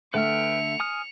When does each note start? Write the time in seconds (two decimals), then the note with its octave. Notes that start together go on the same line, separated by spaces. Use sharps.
0.14 D3 A3 B4 E5 G5 F6 C#7 F7
0.80 G#5 D#6 F6